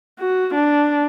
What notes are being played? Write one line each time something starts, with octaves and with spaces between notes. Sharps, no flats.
F#4
D4